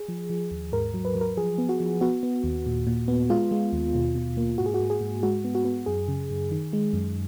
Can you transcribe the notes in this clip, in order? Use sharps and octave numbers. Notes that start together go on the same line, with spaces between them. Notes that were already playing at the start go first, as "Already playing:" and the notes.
Already playing: G#4
F3
F3
D#2
G#2 A#4
F#3
B4
F#3
A#4
F3 G#4
B3
F#4
F3
B3 F#4
B3
D#2
A#2
A#2
B3
G#3 F4
G#3
D#2
B2
B2
A#3
G#2 F#4
G#4
F#4
G#2
G#4
G#2
G#3 F#4
B3
F#4
B3
F#2 G#4
C#3
F#2
D#3
G#3
F#2